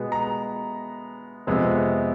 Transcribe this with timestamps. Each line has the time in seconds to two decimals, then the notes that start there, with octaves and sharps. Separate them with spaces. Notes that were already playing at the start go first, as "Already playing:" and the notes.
Already playing: B2 G#3 B3
0.12 A#5
1.47 F2 C3 F3 G#3 B3